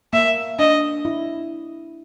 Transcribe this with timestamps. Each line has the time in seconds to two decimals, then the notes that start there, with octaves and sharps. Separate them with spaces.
0.13 A#3 E5
0.59 D4 D#5
1.05 E4